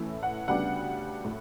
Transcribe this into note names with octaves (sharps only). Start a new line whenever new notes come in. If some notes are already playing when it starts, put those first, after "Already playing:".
Already playing: A2 E3 A3 C#4 E4
F#5
D2 C#3 G3 B3 D4 F#5
A2